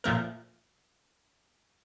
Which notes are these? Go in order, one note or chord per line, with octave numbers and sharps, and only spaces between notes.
A#2 F3 A3 A#4